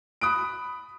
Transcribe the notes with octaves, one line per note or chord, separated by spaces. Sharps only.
B5 D#6 F#6 D7